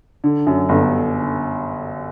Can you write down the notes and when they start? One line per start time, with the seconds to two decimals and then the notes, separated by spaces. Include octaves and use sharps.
0.24 D3
0.47 F#2
0.69 G1